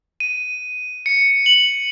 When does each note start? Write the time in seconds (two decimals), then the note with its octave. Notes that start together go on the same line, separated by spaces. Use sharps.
0.20 D#7
1.06 C#7
1.46 F#7